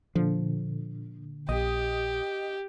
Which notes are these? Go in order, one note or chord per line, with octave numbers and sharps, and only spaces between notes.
A#2 D3 F3
A#1 G4 D#5 D#6